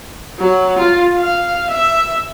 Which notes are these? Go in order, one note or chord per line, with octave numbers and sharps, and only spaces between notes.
F#3
F4
F5
E5